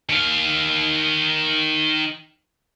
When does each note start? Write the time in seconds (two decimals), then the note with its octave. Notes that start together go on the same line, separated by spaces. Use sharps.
0.09 D#3 F5